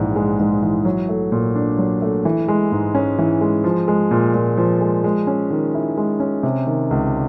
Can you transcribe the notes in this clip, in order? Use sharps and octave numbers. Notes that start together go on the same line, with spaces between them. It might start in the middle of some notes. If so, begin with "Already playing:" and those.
Already playing: A#1 G#2 E3
G#3
G#2
E3
F#3
A3
A#2
D4
F#3
A3
E3
G#3
G#2
C#4
E3
G#3
F3
G#3
A#2
A#2
F3
G#3
G#3
C#4
D#3
E4
G#3
C#4
C3
D#3
C#2